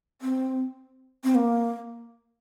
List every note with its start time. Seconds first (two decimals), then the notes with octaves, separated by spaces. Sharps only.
0.22 C4
1.24 C4
1.35 A#3